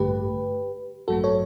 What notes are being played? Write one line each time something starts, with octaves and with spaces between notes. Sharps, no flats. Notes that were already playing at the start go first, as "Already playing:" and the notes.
Already playing: A1 G2 D3 A3 G4 B4
A1 G2 F#3 A3 F#4 A4
A4 C#5